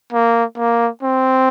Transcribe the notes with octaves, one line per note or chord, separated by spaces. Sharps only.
A#3
A#3
C4